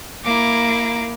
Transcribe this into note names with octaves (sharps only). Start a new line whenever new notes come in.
A#3 E4 A#5 D6